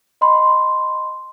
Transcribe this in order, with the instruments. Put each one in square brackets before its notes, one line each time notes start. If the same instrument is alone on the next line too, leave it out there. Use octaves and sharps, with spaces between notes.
[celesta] D#5 B5 C6